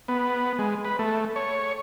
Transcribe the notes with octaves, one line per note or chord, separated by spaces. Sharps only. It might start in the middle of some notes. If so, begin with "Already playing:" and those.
B3
G#3
B4
A3
C#5